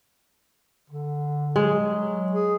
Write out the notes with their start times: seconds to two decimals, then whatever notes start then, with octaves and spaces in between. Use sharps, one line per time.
0.90 D3
1.56 F#3 G#3
2.32 G#4